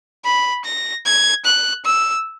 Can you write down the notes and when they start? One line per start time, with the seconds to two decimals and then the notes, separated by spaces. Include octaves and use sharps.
0.25 B5
0.65 A#6
1.06 G#6
1.45 F#6
1.85 E6